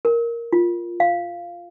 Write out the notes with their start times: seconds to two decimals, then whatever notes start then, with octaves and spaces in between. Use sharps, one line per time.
0.05 A#4
0.53 F4
1.00 F5